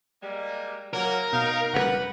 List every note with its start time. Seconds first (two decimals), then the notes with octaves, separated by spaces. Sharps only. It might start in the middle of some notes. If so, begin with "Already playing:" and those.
0.22 G3 G#3 A#3
0.93 F#3 A#3 A#4
1.33 B2 D#4 F5
1.73 F#1 A#2 G3 B4 F#5